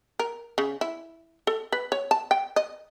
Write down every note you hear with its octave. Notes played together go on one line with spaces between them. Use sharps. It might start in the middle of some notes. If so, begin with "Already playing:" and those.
A#4
C#3
E4
A4
B4
C#5
A5
G5
D#5